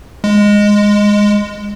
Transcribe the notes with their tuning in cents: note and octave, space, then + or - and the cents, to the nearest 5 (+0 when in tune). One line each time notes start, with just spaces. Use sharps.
G#3 -10